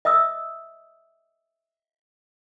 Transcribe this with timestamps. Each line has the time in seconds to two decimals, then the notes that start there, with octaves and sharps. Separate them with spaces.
0.05 D#5 E5 D#6 E6